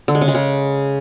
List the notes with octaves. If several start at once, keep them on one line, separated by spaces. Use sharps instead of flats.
D3
G#3
C#3
G#3
C#3